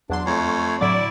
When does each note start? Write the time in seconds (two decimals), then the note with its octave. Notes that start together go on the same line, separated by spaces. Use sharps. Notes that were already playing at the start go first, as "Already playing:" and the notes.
0.10 E2 F#3 D4 C6
0.26 F2 A3 C#5
0.81 A2 D3 F#3 E4 D5